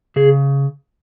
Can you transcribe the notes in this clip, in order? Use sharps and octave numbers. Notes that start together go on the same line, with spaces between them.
C#3 G#4